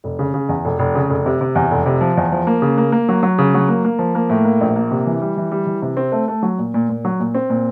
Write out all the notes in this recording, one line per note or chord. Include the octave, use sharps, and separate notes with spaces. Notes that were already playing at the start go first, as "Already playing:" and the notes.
F1
C#3
C#3
E2
F1
F1
C#3
F1
C3
C3
E2
F1
C3
F3
E2
F3
A#3
C#3
A#3
A#3
F#3
F#3
C#3
F#3
A#3
A#3
F3
A#3
A2
A#3
A#1
A#3
C3
E3
G3
E3
G3
E3
C3
C4
A3
A3
F#3
A#2
A#2
A#2
F#3
A#2
C4
A#2